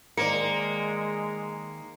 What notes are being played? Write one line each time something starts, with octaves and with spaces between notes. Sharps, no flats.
D#3 G#3 A#3 C5 D5 C#7